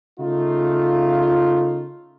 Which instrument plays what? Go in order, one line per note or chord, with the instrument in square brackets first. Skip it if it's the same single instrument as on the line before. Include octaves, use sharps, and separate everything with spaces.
[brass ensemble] C#3 A3 D#4 F4